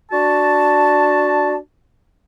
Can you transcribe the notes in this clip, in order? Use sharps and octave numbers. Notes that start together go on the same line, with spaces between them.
D4 F#4 A5